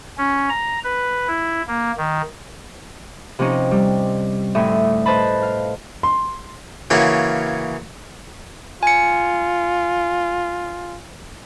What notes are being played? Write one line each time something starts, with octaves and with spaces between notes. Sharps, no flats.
C#4
A#5
B4
E4
A#3
D#3
C3 F3 C4 C#4 D#4
G3
D2 A2 E5 D#6
B4 C5 D#5 A5 B5
F5
C6
C#3 E3 A#3 C#4 F#4 C#5
F4 G#5 C#7